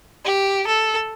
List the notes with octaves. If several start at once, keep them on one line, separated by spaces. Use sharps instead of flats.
G4
A4